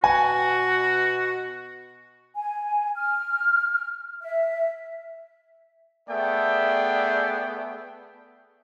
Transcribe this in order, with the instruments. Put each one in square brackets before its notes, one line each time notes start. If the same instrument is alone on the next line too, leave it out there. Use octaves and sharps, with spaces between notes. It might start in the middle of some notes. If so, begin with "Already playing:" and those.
[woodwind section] B2 F#4 [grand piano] G#5
[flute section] G#5
F6
E5
[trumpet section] A3 B3 G#4 D5 E5 G5